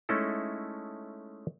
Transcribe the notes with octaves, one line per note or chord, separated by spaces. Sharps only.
G#3 A3 C#4 D#4 E4 A4